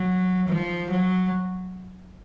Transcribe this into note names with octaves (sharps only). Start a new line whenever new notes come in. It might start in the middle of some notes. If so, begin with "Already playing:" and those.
Already playing: F#3
F3
F#3